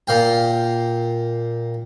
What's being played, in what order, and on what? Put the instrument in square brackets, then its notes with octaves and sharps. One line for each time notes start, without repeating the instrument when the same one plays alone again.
[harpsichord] A#2 F5 G5